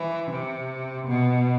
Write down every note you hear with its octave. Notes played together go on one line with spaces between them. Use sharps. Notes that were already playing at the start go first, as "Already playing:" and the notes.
Already playing: E3
C3
B2